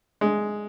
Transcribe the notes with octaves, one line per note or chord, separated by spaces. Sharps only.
G#3